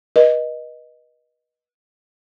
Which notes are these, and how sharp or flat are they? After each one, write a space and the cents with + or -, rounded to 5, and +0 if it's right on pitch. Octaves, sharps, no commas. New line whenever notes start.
B4 -35 D#5 -5